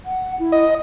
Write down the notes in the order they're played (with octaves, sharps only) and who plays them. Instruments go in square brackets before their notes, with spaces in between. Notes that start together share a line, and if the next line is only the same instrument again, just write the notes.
[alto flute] F#5
E4
[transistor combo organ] D#5